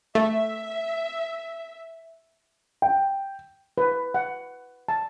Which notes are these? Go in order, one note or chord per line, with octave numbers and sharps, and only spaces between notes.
A3 E5
G5
B4
F#5
A5